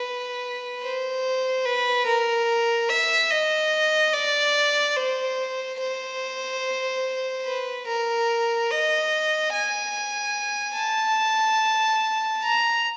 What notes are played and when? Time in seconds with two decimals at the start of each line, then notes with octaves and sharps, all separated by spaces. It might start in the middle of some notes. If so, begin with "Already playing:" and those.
Already playing: B4
0.82 C5
1.65 B4
2.07 A#4
2.90 E5
3.31 D#5
4.14 D5
4.97 C5
5.80 C5
7.46 B4
7.87 A#4
8.70 D#5
9.53 G#5
10.77 A5
12.43 A#5